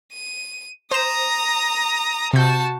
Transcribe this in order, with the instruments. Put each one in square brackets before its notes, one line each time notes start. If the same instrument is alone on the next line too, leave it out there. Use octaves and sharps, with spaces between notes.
[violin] D#7
[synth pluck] C5 E7 [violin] A#5 D#6
[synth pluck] C3 G6 [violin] F#4 A5